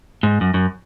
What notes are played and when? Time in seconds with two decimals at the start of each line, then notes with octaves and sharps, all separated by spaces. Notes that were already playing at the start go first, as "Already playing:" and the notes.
0.23 G#2
0.41 F#2
0.54 F#2